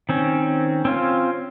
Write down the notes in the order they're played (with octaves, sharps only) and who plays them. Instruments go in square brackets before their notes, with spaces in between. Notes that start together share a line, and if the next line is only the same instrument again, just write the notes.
[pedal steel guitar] D#3 C4 C#4
C4 C#4 F4